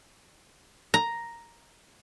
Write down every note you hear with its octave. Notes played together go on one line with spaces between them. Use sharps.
A#5